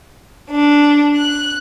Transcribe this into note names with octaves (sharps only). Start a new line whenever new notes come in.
D4
F#6